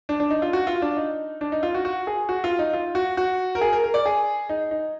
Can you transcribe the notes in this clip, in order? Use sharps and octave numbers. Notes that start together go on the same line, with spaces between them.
D4
D4
D#4
F4
F#4
F4
D4
D#4
D4
D#4
F4
F#4
F#4
G#4
F#4
F4
D#4
F4
F#4
F#4
A#4
G#4
A#4
A#4
D5
G#4
D#4
D#4